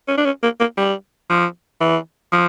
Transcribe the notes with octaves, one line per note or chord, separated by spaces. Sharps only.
C#4
D4
C#4
A#3
A#3
G3
F3
E3
F3